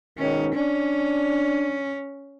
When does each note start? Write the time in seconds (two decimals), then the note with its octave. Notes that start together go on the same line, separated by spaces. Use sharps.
0.18 G#2 B2 D#3 C#4
0.54 C#4 D4